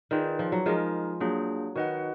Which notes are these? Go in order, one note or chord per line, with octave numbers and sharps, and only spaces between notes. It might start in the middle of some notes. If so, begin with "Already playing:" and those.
D#3 F4 G#4 B4 D5
F3
F#3
F3 G#3 D#4 A#4 D#5
F#3 A#3 D4 F4 G#4
D#3 F#4 B4 D#5 F#5